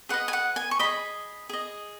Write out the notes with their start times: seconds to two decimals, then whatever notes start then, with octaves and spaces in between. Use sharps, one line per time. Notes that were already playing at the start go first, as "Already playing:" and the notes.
0.09 G#4 B4 D#5 F#5
0.28 G#5
0.33 F#5
0.56 G#5
0.71 C#6
0.79 G#4 D#5 B5
1.49 G#4 D#5